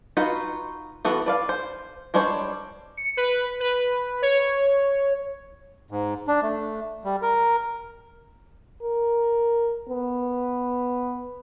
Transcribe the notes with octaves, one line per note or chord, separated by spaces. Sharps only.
D#4 F4 F#4 B4
E3 B3 F#4 A4
B4 D5 F5
C5
G3 G#3 D4 C5 C#5
C#7
B4
B4
C#5
G#2
D4
A3
G3
A#4
A#4
B3